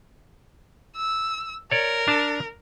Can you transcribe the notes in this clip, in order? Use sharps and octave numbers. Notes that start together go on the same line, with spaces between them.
E6
A#4 C#5 D5
D4 A5